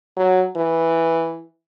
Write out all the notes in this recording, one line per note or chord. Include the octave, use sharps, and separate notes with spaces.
F#3
E3